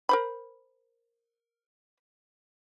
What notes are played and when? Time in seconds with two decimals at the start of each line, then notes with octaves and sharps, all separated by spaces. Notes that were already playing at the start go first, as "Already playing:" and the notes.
0.09 A#4 C5 B5